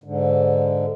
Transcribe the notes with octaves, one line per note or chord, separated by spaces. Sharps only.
G#2 D3